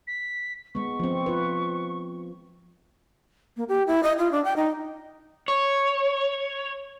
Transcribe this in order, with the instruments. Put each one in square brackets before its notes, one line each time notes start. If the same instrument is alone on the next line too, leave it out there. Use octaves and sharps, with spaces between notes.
[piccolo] B6
[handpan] G#3 B3 [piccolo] C#6
[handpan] F3 C4
F4 B4
[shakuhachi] A#3
G4
E4
D#5
F4
D4
G5
D#4
[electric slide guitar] C#5